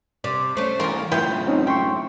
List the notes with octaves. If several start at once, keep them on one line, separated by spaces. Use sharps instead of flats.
C3 D5
A3 C#4 C5 C#6
G#2 E3 F3 F4 A#4
F#2 A2 C#3 B3 E4 F4 G5
C4 C#4 D#4
E5 G5 C6 C#6